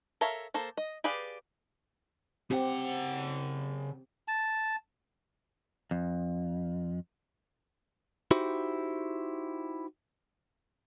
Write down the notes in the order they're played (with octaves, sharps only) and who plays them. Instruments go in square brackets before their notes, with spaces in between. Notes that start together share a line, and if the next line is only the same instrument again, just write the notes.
[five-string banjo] A4 A#4 C#5 E5 F5
A#3 A4 C5
D#5
G4 G#4 B4 D5 F5
[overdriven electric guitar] C#3 F#5 [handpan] C4 G4
[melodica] A5
[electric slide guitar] F2
[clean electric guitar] D#4 E4 F#4 G4 C5